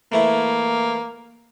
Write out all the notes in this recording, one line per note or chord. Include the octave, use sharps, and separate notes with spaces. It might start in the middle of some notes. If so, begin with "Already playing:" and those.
E3 A3 A#3 E4